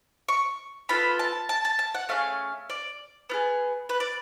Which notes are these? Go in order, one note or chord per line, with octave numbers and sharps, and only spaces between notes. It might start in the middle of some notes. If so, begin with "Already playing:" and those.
C#6
B3 F4 A4 B5
A5
A5
A5
A5
F#5
A3 C#4 G#4 F5
D5
B3 F4 G#4
B4
D5